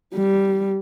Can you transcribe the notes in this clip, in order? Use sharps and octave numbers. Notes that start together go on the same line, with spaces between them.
G3